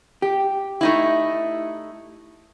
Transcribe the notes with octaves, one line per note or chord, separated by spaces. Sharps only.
G4
A3 D#4 E4